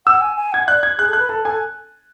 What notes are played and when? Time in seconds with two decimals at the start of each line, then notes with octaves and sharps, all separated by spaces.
0.06 F#5 E6
0.21 G#5
0.37 G#5
0.52 F#5 G#6
0.68 D5 F#6
0.83 G#6
0.98 G#4 F#6
1.08 A4
1.13 F#6
1.19 B4
1.29 A4 A5
1.45 A4 G#5